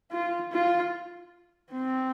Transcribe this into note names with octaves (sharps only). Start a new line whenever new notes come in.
F4
F4
C4